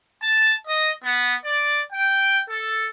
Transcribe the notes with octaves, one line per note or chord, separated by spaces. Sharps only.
A5
D#5
B3
D5
G5
A4